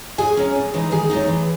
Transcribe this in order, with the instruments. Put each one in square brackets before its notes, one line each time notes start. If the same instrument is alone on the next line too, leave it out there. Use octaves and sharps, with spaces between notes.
[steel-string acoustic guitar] A2 G#4 G#5
F#3 C#4
A2
E3 G#3 D#4
D#3 G#4 G#5
F#3 A3 C4 D#4
E3